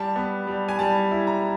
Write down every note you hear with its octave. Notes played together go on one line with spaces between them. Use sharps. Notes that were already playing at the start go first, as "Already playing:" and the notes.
Already playing: G3 A5
B3
G3
G#5
G3 A5
E4
A#5